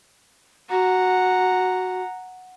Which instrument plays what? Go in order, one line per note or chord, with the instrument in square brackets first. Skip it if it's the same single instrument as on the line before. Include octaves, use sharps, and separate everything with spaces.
[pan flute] F#4 [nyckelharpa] F#5 A#5